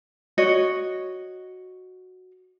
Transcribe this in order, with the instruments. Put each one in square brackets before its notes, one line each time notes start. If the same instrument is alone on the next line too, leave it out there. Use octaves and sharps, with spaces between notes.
[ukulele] F#4 C#5 D#5